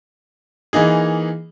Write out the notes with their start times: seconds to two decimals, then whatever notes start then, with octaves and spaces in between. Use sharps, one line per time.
0.73 E3 A#3 D#4 G#4